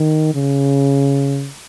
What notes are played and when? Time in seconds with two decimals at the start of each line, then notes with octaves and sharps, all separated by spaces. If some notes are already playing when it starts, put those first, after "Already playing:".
Already playing: D#3
0.34 C#3